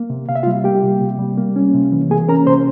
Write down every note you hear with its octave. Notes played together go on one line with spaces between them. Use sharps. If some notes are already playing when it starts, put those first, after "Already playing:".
Already playing: A#3
C3
C3 F5
E5
F4 F5
G3
A#3 G4 G5
C3
C3
G3
A#3
C#4
C3
E3
A#3 G#4 G#5
C#4 A#4 A#5
C3 C5 C6